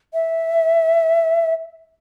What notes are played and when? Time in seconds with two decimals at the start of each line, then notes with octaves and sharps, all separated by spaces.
0.14 E5